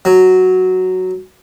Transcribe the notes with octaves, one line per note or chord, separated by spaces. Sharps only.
F#3